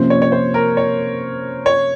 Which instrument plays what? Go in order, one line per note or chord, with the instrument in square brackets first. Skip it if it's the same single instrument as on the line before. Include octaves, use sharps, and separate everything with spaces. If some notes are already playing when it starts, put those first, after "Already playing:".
Already playing: [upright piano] C3 F3 A#3 C#4 [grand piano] C5
[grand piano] C#5
C#5
C5
A#4
C#5
C#5